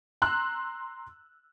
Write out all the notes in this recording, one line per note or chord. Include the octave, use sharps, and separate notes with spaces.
A#5 C6 E6 F#6